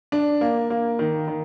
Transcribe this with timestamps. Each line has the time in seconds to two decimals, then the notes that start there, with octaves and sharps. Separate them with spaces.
0.12 D4
0.41 A#3
0.70 A#3
0.99 D#3
1.28 D#3